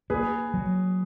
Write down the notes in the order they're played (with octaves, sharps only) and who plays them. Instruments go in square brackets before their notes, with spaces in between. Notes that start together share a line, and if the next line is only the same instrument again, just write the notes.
[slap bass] A#3 [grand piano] G#4 B4
[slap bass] F#3